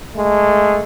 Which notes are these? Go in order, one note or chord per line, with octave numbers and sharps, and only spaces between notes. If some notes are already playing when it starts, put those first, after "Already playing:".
G#3 A3